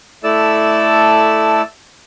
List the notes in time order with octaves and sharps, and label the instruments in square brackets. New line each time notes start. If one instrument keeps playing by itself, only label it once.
[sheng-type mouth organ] A3 E4 A4 D5 A5 E6